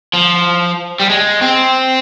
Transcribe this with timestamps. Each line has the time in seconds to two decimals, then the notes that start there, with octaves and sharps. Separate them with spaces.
0.14 F3
1.00 G3
1.09 G#3
1.41 C4